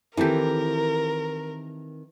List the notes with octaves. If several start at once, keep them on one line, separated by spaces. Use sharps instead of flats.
D#3 E3 C4 G4 A4 A#4